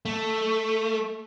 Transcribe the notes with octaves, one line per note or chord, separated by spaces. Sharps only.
A3